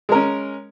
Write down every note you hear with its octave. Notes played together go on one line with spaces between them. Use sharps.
G#3 C#4 A#4